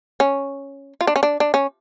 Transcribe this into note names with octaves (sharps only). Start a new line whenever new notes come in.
C#4
F4
D4
C#4
D4
D4
C#4